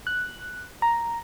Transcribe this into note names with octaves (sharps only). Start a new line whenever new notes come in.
F#6
A#5